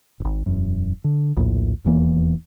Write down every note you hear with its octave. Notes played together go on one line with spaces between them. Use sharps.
D#1 G#1
E1 F#2
D3
A#1 D#2 A2
D#1 E2 E3 A#3